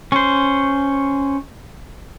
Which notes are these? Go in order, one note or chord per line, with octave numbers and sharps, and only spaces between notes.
C#4 C5